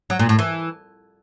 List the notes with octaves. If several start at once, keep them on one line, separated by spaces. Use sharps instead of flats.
F#3
A#2
A2
E3